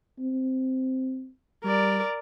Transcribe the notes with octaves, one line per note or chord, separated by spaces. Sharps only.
C4
G3 A#4 D5